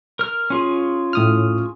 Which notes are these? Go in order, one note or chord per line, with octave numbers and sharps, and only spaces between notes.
A#4 F6
C#4 F4 G#4
A2 D#6 F6